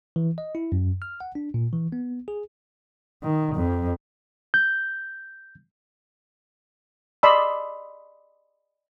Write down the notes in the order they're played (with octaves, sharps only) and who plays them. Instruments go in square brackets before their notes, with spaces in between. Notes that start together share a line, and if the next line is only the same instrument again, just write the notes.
[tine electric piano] E3
D#5
E4
F#2
F6
F#5
D4
A#2
E3
B3
G#4
[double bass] D#3
F2
[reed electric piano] G6
[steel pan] D5 D#5 A5 B5 C6 E6